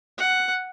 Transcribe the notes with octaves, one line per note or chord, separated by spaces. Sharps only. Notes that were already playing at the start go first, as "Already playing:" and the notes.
F#5